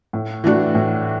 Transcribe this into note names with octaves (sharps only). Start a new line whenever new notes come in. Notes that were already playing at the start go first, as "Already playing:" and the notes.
A2
E3 A3 D4 F#4
A2